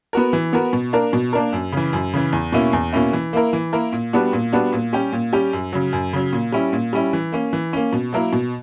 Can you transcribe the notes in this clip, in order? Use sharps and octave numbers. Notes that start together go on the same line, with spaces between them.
B3 F#4 A#4
E3
B3 F#4 A#4
B2
A#3 D4 A#4
B2
A#3 D4 A#4
F#2
C#3 E3
F#2
C#3 E3
E2
B2 A#3 C#4 E4
E2
B2 A#3 C#4 E4
E3
A#3 E4 A#4
E3
A#3 E4 A#4
A#2
G3 B3 D4 F#4
A#2
G3 B3 D4 F#4
A#2
G3 C#4 G4
A#2
G3 C#4 G4
F#2
C#3 F#3
F#2
C#3 F#3
A#2
G3 C#4 E4
A#2
G3 C#4 E4
E3
A#3 C#4
E3
A#3 C#4
B2
F#3 A#3 E4 A#4
B2